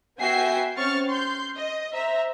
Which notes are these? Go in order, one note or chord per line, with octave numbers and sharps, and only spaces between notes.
B3 F#4 E5 G5 G#5 C7
C4 C#4 C#6 F6 A6
C6 G6
D#5
C5 E5 A#5